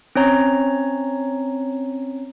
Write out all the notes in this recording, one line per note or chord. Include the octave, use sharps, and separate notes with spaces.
C4 C#4 C#5 A#5